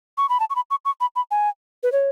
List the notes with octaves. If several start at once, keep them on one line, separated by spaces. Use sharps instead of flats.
C#6
B5
A5
C#6
B5
C#6
C#6
B5
B5
G#5
B4
C#5